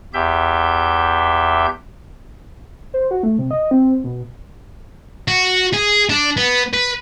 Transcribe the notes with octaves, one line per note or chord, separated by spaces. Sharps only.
E2 G4 E5 G6
C5
F#4
A3
C3
D#5
C4
B2
F#4
G#4
D4
B3
B4